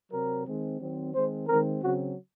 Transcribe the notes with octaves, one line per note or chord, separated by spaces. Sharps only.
C3 F#3 C4 A#4
D#3 G#3 C4
D#3 F#3 C4
D#3 G#3 C4 C5
D#3 G#3 C4 A#4
C#3 F#3 C4 F#4